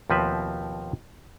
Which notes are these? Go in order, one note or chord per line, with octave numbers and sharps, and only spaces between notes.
D#2 B2 F3 C4 B4 E5